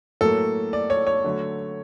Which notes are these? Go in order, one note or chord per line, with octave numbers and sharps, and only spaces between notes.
A2 F#3 A#3 A4
D5
C#5
C#5
D3 F#3 A3